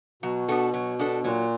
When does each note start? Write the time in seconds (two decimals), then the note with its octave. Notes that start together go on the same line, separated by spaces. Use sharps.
0.22 B2 F#3
0.48 B3 D4 F#4 A4
0.74 F#3
0.99 B3 D4 F#4 A4
1.24 A#2 F#3